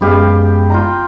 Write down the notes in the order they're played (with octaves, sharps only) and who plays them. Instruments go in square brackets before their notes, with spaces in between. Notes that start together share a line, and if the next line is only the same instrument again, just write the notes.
[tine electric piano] F#2 G#3 [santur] B3 G4 F5
[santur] F4 G5 A#5